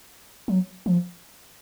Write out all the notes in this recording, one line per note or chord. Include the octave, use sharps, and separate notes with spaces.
F#3
F3